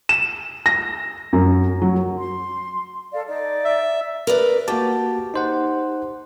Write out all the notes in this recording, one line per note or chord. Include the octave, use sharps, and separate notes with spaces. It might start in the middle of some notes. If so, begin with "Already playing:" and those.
E7
A#6
F#2
F#3
C6
A4 D5 F5
D#4 D5
E5
A#4 B4 D5
A#3 F#4 G4 A5
D#4 C5 F#5